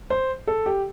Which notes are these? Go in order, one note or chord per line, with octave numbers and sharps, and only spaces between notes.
C5
A4
G4